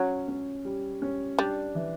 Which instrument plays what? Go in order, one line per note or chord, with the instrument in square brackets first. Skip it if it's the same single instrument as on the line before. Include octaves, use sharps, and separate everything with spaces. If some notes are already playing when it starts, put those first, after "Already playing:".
Already playing: [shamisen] F#3 [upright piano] C#4
[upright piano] C#4
G3
C#4
[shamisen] G3 [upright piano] D4
[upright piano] E3